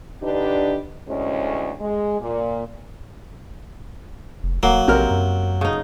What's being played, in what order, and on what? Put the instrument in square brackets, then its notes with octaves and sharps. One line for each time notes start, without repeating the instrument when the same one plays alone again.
[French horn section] D3 D4 D#4 G4 B4
D2 A2 G#3 C#4
G#3
A#2
[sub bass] F1
[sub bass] D1 [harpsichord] F#3 [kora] A#3
[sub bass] A#1 [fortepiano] C3 A#4 F6
[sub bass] F#2
[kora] C#3 D#4